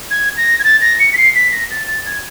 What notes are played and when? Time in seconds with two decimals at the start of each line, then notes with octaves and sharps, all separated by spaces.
0.11 G#6
0.37 A#6
0.59 G#6
0.64 A6
0.81 A#6
1.00 C#7
1.13 B6
1.17 C7
1.35 B6
1.52 A#6
1.71 A6
1.88 A6
2.06 G#6